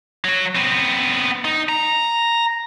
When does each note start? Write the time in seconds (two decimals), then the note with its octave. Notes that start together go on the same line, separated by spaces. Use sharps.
0.25 F#3 F#4
0.55 B3 C4
1.45 D#4
1.69 A#5